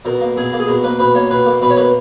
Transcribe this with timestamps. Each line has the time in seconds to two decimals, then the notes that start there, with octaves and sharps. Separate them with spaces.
0.05 B2 A#4
0.21 A#3
0.37 B2 G#4
0.53 A#3
0.59 G#4
0.67 B2 A#4
0.83 A#3 B4
0.99 B2 B4
1.15 A#3 C#5
1.30 B2 B4
1.46 A#3
1.61 B2 B4
1.70 C#5
1.76 A#3 B4